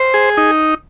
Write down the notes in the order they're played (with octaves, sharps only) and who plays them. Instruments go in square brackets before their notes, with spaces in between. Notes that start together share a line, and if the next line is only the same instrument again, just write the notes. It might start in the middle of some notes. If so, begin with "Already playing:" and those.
Already playing: [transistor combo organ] C5
G#4
D#4